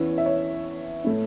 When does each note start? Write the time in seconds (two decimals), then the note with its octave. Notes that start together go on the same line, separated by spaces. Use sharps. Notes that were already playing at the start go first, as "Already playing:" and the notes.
Already playing: E2 E3 C#4 E4 C#5
0.18 E5
0.26 C#5
1.04 A2 A3 E4